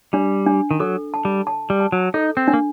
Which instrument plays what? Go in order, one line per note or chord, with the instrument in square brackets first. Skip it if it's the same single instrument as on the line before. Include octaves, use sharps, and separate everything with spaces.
[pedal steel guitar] G3 [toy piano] D4
[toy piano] D4
[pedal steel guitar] D#3
[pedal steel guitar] F#3 [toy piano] A4
[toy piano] A5
[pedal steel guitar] G3
[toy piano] A5
[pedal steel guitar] G3
[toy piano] A5
[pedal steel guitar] F#3
[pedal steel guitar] D#4 [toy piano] A4
[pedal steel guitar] C4
[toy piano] D4
[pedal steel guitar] A#3